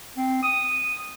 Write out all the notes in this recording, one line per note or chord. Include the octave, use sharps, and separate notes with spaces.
C4
D#6